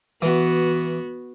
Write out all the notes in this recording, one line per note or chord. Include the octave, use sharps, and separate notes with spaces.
E3 B3 F#4